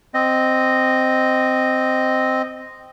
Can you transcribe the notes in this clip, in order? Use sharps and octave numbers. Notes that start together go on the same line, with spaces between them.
C4 D#5